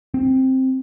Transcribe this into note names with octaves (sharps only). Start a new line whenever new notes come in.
C4